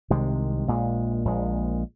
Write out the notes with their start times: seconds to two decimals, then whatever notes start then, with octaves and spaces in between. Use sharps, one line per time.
0.10 C2 C3 D#3 G#3
0.67 A#1 A#2 G#3
1.25 A#1 A#2 G#3